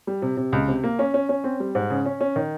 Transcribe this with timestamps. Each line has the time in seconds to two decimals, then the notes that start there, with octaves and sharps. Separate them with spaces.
0.07 G3
0.22 C3
0.37 C3
0.53 C#2
0.68 C3
0.84 A#3
0.99 C#4
1.14 C#4
1.29 C#4
1.44 C4
1.60 G3
1.75 G#2
1.90 C#3
2.06 C#4
2.21 C#4
2.36 D#3